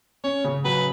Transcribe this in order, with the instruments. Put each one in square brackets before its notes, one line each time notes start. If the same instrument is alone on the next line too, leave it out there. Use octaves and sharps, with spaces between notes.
[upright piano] C#4 [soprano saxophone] C#5
[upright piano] C#3
[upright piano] F#3 [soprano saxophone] B4